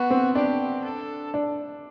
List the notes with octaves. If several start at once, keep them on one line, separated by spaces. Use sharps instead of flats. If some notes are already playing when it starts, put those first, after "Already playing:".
Already playing: B3 F#4
C4
D4 G4
A4
D4